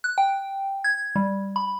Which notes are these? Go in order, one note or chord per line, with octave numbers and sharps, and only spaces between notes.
F#6
G5
G#6
G3
B5